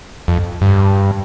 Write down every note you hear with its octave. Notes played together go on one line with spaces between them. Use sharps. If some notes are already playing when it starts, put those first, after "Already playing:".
F2
G2